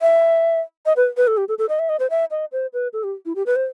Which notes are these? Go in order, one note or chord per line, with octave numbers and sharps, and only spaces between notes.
E5
D#5
B4
B4
A4
G4
A4
A4
D#5
E5
D#5
C5
E5
D#5
C5
B4
A4
G4
E4
G4
B4
C5